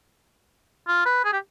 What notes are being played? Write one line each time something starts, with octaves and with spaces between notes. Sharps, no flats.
F4
B4
G#4
G4